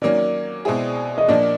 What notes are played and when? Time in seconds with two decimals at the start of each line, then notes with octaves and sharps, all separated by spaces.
0.02 D#3 F#3 A#3 C#4 D5
0.65 B2 G#3 C4 E4 G#4
1.18 D#5
1.28 A#2 F3 A#3 D4 D5